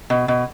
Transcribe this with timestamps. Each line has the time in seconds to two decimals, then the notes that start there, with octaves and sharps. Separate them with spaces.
0.10 B2
0.28 B2